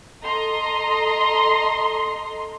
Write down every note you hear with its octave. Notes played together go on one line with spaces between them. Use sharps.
A4 D#5 A#5 C6